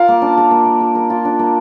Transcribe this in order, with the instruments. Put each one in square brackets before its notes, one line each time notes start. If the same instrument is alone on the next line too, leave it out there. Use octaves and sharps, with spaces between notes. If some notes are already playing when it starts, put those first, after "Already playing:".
Already playing: [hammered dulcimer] F4 A#4 [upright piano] F5
[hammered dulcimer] A#3
D4
A#4
A#3
A#3
A#4
A#4
F4
D4
A#3